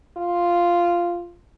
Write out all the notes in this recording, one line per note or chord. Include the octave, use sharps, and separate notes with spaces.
F4